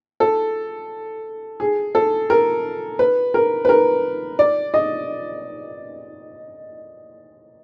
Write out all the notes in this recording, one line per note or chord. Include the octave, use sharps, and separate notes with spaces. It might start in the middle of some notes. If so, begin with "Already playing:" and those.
A4
G#4
A4
A#4
B4
A#4
B4
A#4
D5
D#5